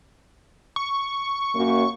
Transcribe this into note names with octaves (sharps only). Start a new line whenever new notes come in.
C#6
F#2 A#3